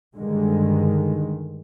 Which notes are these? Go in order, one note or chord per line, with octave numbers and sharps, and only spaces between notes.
G2 D3 D#3 G#3